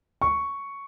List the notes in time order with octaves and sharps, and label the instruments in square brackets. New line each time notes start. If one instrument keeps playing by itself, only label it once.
[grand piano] C#6